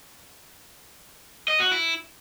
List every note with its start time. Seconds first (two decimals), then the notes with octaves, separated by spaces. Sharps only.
1.48 D#5
1.60 F#4
1.71 E4